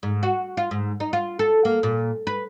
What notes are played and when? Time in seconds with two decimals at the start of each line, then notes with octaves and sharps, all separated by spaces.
0.03 G#2
0.23 F#4
0.57 F4
0.71 G#2
1.00 D#4
1.13 F4
1.39 A4
1.65 A#3
1.83 A#2
2.27 B4